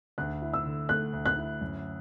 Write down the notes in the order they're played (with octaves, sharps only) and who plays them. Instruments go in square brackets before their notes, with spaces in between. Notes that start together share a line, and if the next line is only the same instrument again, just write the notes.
[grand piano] D2 [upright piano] F#6
[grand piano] E4
[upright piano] E6
[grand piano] D3
[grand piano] A3 [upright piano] F#6
[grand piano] D2
[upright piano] F#6
[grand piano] E4
F#2